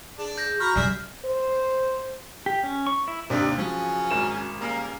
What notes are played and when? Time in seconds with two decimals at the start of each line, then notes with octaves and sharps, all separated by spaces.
0.18 D4 G#4
0.38 G6 A#6
0.60 F#4 A#5 B5 C#6 F6
0.75 C#3 G3 G#4 D5 E5
1.25 C5
2.46 G4
2.64 C#4
2.87 C#6
3.08 E4
3.30 D#2 C3 D4
3.58 C#3 F3 F#3 C#4
4.11 G#1 A#4 E7
4.61 C#3 G3 A#3